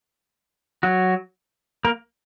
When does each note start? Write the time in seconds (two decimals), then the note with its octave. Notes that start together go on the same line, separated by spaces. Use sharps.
0.83 F#3 F#4
1.85 A#3 A#4